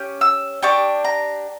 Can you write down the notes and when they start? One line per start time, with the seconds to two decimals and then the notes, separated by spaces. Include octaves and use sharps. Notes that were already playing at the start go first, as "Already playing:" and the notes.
Already playing: C#4 G4
0.21 E6
0.62 D4 G4 C#6
1.05 A#5